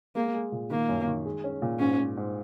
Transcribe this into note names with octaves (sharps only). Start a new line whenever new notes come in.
G#3 A#3
G#3
A#2
D#3 A#3
F#2
D#3
G#3
C#4
A#2
G#2 C#4
G#2
G#2